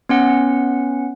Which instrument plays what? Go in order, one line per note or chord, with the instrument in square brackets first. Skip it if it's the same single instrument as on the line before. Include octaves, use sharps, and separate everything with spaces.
[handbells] B3 C#4 F#5